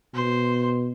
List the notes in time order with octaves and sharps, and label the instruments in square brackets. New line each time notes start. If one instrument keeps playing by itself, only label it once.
[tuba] B2 [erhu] C5